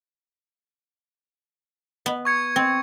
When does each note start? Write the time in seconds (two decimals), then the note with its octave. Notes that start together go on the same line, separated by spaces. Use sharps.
2.06 B3
2.25 C#6 G#6 C#7
2.56 C4